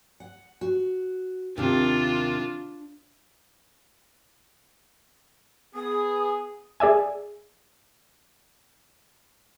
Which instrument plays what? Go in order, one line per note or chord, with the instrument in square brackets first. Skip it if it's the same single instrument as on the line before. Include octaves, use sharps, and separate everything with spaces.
[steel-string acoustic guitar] F#5
F#4
[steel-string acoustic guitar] D#2 C3 D#3 [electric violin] D4 F4
[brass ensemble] B3 G#4 [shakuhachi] D#6
[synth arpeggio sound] G#4 D5 E5 G#5